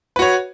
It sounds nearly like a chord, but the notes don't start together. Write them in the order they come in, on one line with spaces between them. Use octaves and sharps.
B4 F#4 C#5